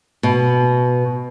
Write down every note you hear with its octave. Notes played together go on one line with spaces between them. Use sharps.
B2